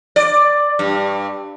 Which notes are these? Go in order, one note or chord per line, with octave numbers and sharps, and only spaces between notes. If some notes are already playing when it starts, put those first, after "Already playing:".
D5
G2